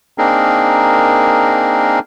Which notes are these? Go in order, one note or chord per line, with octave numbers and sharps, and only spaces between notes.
A#3 C4 D4 D#4 G#4 A#4